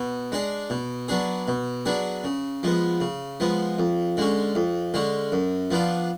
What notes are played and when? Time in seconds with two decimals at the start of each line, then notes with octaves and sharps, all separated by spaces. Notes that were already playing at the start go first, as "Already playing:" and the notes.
Already playing: B2
0.32 G#3 D4 G#4
0.70 B2
1.08 F#3 B3 D4 G#4
1.48 B2
1.86 F#3 B3 D4 G#4
2.24 C#3
2.63 F3 G#3 B3
3.01 C#3
3.40 F3 G#3 B3
3.79 F2
4.17 D3 G#3 C#4
4.55 F2
4.94 D3 G#3 C#4
5.32 F#2
5.71 F3 B3 D4 F4